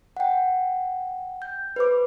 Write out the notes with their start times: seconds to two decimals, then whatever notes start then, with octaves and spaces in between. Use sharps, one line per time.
0.17 F#5 G5
1.42 G6
1.76 B4 C5 D6